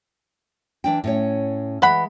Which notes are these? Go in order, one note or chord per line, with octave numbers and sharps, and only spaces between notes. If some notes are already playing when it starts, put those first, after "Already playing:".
E3 D4 G5
A2 C#4 C#5
E3 G#3 B4 F#5 B5